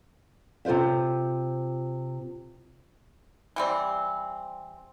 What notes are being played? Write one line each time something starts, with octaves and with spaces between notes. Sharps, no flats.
C3 F4 B4 C5 E5
E3 G3 C4